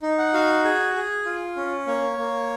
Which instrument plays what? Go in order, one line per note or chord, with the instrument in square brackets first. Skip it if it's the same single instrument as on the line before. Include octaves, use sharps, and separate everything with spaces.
[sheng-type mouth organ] D#4
F#5
F#4 F5
G#4
G#4
F4
C#4
A#3 C#5
A#3